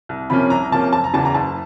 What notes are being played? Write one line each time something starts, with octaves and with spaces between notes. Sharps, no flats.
C2
C3 F3 A#3 C#4 B5
C2 A#5
C3 F3 A#3 C#4 A5
F#1 A5
A#5
E2 C#3 E3 A5
A#5
F#1 A5